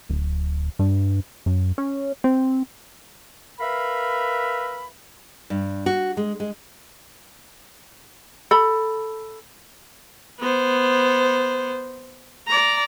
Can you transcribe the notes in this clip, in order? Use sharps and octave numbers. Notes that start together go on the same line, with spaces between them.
D1
G2
F#2
C#4
C4
A#4 B4 E5 F5 B5
G2
F#4
G#3
G#3
A4 B5
B3 C5
D5 A#5